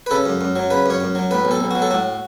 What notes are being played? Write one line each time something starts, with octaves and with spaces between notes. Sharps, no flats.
B4
C#3 A4
F#2
F#2
F#3
C#3 B4
F#2 C#5
F#2
F#3
A2 B4
B1
A4
B1
F#3 F#4
A4
A2 F#4